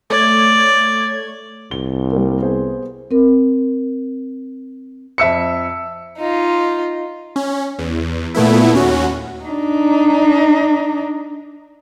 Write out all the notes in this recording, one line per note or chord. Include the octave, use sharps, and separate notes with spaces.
A3 C#5 D5 G#6
C2 G7
G3 A#3
B3 G#4 C5
C4 A#4
F2 E5 E6 C#7
D#4 F4
C#4
E2
A#2 A3 B3 E4
D#2 C#4 F#4
D4 D#4